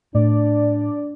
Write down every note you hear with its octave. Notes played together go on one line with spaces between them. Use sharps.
A2 D4 D5